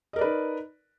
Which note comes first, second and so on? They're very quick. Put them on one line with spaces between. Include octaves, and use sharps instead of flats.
D#5 A#4 D5 B4 D#4